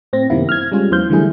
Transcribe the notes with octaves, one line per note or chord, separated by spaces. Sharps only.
A2 C4 A#6
F#2 C3 D#3 A#3 B3 E4
F6 G#6
G3 G#3 C#4 F4
E2 E3 F#3 C5 F5 G6
D3 E3 G3 A3 E4 G#4